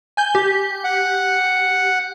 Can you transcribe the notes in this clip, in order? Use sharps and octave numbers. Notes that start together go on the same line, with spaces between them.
G#5 G6 G7
G4
F#5